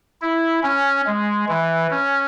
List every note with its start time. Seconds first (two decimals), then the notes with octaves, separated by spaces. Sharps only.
0.22 E4
0.63 C#4
1.07 G#3
1.49 E3
1.91 C#4